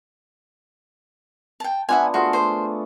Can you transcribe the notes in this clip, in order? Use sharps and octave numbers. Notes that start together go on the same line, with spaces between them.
G5 A5
B3 D4 F4 E5 F#5 G#5
A3 F4 F#4 G#4 C5
C5